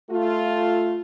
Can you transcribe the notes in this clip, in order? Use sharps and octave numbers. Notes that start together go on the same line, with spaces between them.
A3 F4